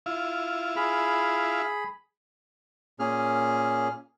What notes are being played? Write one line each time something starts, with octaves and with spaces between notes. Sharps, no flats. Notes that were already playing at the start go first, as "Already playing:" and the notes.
E4 F4
G#4 B5
A#2 A#3 C#4 G#4 F6